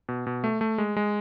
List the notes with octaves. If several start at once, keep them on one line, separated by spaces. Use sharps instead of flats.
B2
B2
A3
A3
G#3
G#3